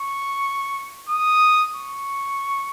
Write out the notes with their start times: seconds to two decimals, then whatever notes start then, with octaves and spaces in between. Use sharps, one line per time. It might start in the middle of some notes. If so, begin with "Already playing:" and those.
Already playing: C#6
1.09 D#6
1.76 C#6